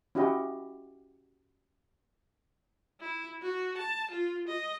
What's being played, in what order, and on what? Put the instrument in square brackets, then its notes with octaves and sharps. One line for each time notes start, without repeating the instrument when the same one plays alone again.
[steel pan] C#4 E4 F#4 G4 D#5
[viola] E4
F#4
A5
F4
D#5